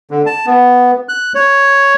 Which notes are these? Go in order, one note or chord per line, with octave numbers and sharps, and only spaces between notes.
D3
A5
B3
F#6
C#5